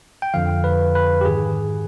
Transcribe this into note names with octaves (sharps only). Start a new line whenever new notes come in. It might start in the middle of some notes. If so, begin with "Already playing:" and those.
G5
F2 D3 F3 F5
B4
B4
G4
G#2 D#3 G#4